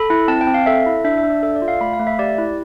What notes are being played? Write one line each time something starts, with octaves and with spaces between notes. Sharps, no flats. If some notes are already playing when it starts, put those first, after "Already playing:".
Already playing: A4 B5
E4
C4 A5
G5
C4
F5
A4 E5
E4
D4 E5
E5
D4
D5
A4 E5
D5
F4
F5
A3 B5
F5
A3
E5
G4 D5
E4